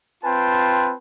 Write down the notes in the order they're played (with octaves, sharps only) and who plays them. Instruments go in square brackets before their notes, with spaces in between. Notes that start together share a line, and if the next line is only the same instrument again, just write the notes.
[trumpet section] C4 F4 B4 G5 A5 C6